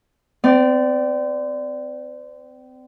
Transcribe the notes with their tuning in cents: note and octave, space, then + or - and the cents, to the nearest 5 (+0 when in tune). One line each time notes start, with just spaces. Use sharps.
C4 -35 D5 +0